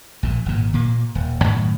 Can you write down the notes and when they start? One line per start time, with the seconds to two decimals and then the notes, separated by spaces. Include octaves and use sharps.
0.23 A#1 A#2
0.46 G#1 A#2
0.74 A#2 A#3
1.15 D#1
1.41 F#2 A2 D#3